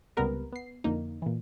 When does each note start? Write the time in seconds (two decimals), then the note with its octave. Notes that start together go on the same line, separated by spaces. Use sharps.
0.17 C#2 C3 G3 B3 A#4 B4
0.53 B3 C7
0.84 F2 D3 A#3 D#4
1.22 A#2 E3